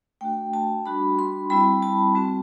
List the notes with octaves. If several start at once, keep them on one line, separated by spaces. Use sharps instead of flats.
A3 D4 F#4 G5
A5
G3 D4 F#4 B5
C6
G3 C4 E4 B5
A5
G3 C4 F#4